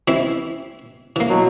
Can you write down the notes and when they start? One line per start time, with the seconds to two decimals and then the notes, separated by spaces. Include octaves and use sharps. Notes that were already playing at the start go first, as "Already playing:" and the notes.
0.08 E3 C4 E4
1.16 E3 A#3
1.29 B2 F#3